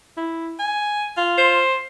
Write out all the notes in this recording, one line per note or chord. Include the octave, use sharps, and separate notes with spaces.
E4
G#5
F4
C5